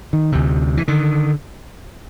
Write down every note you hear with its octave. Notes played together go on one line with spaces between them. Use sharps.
D#3
D2 C3
E3
D3 D#3